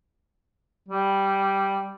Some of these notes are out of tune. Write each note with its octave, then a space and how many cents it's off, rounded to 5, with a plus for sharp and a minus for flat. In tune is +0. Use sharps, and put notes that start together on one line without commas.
G3 -5